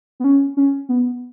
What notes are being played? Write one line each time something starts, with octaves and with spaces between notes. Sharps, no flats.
B3
C#4
C#4
B3